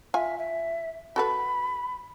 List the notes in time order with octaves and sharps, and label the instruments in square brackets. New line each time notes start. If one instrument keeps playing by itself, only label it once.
[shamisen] F4 G#5 [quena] E5
[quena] E5
[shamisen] F#4 A4 B4 [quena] B5